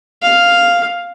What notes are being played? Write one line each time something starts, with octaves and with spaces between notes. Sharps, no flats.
F5